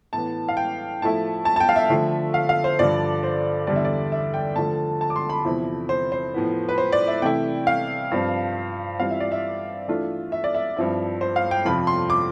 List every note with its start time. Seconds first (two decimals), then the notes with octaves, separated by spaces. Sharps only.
0.13 A2 E3 B3 A5
0.49 F5
0.57 G5
1.02 A2 F3 A3 E4 A5
1.45 A5
1.56 A5
1.60 G5
1.69 F5
1.76 E5
1.90 D3 F3 A3
2.34 F5
2.49 F5
2.64 C5
2.79 G2 D3 F3 D5
3.23 C5
3.67 E2 D3 G3 D5
3.76 E5
3.85 D5
4.12 E5
4.34 G5
4.56 D3 F3 A3 A5
5.01 A5
5.10 D6
5.16 C6
5.30 B5
5.45 E2 C3 F3 C4 E4
5.89 C5
6.12 C5
6.34 A2 F3 B3
6.69 B4
6.78 C5
6.92 D5
7.07 E5
7.22 C3 E3 A3 E4 G5
7.67 F5
8.11 G2 F3 C4
9.00 E3 G3 C4 F4 F5
9.11 E5
9.20 D5
9.32 E5
9.88 E3 A3 D4 F4
10.32 E5
10.44 D5
10.54 E5
10.76 G2 F3 C4 E4
11.21 C5
11.36 F5
11.51 G5
11.65 F2 C3 F3 C4 F4 B5
11.87 C6
12.10 D6